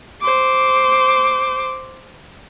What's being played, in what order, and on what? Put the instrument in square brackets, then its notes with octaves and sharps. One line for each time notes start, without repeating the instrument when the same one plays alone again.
[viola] C5 D6